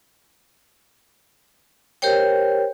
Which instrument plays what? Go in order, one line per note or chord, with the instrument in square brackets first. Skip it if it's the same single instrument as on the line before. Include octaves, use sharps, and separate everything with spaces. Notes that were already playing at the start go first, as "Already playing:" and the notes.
[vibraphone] G4 A#4 C5 C#5 G5